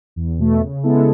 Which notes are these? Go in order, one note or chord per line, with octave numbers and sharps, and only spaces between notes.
E2
B2 A3
C#3
G#3 B3 E4 A4